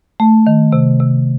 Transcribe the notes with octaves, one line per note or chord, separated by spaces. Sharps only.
A3
D#3
C3
C3